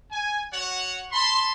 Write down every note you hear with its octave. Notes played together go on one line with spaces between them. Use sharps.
G#5
F#4 C#5 F#5
A5 B5 C6